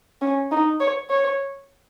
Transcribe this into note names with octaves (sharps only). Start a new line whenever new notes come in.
C#4
D#4
C#5
C#5